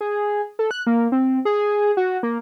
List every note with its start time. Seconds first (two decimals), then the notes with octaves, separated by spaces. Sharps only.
0.01 G#4
0.59 A4
0.71 F#6
0.87 A#3
1.12 C4
1.45 G#4
1.97 F#4
2.23 A#3